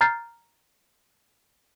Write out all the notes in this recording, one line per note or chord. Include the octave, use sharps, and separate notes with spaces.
A#5 F6 G6 A6 C7